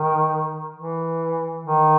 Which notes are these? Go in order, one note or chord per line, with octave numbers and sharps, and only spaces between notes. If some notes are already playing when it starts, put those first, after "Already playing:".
Already playing: D#3
E3
D#3